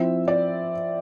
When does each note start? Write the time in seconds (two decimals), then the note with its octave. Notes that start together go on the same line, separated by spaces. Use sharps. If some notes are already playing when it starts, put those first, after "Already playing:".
Already playing: F3 C4 E4 E5
0.28 D5